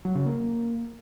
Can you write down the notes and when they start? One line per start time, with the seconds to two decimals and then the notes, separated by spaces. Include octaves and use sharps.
0.05 F#3
0.15 C#3
0.26 A#3